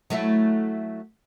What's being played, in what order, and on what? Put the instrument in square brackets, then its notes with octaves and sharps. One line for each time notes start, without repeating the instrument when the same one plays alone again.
[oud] F#3 A3 E4